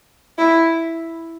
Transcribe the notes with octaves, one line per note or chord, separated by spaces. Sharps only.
E4